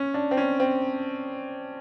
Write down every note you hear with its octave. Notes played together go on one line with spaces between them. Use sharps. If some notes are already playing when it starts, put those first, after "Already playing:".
Already playing: C#4
D4
C4
C#4
C4